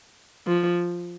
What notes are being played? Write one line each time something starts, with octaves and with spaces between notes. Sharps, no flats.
F3